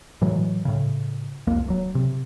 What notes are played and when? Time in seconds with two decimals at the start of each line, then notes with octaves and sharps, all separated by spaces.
0.21 A2 E3 F#3 G#3
0.65 A2 C#3
1.47 C2 F2 A#3
1.67 D1 F#3
1.95 C3